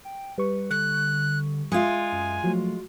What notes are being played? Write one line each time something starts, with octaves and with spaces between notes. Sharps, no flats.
G5
G3 B4 C#6
D3 F#6
G#3 F4 E5 G#5 D#6
F#2
F3 F#3 A3 F#4